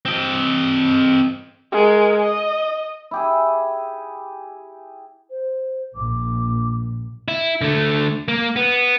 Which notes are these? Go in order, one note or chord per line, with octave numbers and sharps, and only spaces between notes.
C4 D#5
G#3 A#4
D#5
E4 G4 G#4
C5
A#1 A#2 D6
E4
D3 A3
A#3
B3